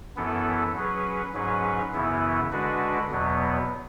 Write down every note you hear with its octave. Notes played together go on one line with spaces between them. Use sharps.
F#2 E3 B3 E4 A4
F#3 C#4 G#4 B4
G#2 F#3 C#4 G#4 B4
F#2 C#3 E3 B3 E4
D3 G#3 D4 F#4 B4
E2 B2 F#3 B3